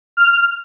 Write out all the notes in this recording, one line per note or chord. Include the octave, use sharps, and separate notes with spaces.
F6